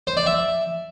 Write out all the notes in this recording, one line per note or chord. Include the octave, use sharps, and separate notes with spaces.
C5
D5
E5